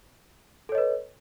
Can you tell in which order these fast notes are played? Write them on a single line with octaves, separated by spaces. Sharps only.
A4 C#5 D#5 B4